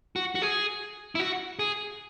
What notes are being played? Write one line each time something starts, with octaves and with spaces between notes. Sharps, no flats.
F#4
F#4
G#4
E4
F#4
G#4